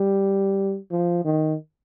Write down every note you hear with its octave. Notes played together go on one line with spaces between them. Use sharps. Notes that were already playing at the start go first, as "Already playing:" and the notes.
Already playing: G3
F3
D#3